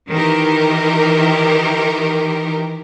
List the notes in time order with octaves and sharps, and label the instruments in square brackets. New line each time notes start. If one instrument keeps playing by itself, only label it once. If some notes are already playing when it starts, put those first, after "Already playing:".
[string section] D#3 E3 G4 A#4